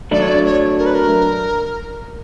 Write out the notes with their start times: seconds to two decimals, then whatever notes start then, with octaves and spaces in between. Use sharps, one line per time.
0.11 F#3 A3 D4 D5
0.22 C#5
0.29 D5
0.45 C#5
0.78 A#4
0.86 B4
0.94 A#4